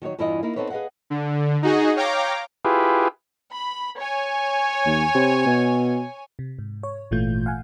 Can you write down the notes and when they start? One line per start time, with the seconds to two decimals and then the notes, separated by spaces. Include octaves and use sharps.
0.02 D#3 F#3 D#4 C#5
0.18 E2 G2 E3 E4 F4 D#5
0.43 A#3 D#4 E4
0.56 B3 C4 D#4 A4 B4 C#5
0.70 G#4 B4 D#5 F5 F#5
1.10 D3
1.62 D#4 F#4 G#4 D#5
1.96 C#5 F5 G5 A#5 D6
2.65 E4 F4 G4 G#4 B4
3.52 B5
3.99 C#5 G#5
4.86 D#2
5.15 C3
5.46 B2
6.39 C3
6.59 G#2
6.83 C#5
7.11 G#1 A#2 E3 A3 F4 G6
7.46 F5 F#5 G#5